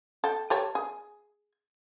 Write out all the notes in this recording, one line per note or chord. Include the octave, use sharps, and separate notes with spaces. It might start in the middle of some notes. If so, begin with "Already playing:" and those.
A4 G5
G4 A4 C#5
G#4